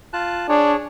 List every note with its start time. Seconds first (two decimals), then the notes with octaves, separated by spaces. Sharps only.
0.13 F4 A5 F#6
0.49 D4 G#4 C#5